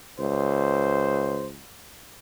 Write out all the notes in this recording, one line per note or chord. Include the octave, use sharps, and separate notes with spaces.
C#2 C5